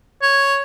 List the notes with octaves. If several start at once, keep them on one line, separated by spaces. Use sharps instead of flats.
C#5